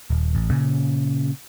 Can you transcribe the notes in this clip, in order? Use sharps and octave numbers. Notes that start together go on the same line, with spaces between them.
D#1
A1
A#2 C#3 C#4